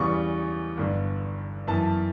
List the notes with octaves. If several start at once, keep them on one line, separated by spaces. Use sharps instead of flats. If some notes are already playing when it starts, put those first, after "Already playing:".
Already playing: E2 C#3 G3 B3 C#6
G1 G2 D3
F#2 E3 B3 A5